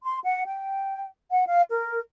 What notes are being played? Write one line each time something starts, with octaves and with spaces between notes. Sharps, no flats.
C6
F#5
G5
F#5
F5
A#4